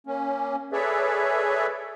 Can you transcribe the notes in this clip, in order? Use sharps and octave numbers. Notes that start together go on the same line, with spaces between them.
A#3 C#4
G#4 A4 B4 C#5 D5 E5